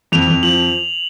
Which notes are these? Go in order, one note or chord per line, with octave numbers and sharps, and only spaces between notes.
F2 F7
F2
F3 F#7